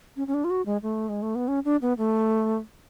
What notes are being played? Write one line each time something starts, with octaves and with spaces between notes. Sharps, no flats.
C#4
C#4
D4
F4
F#4
G#3
A3
G#3
A3
B3
C#4
D4
B3
A3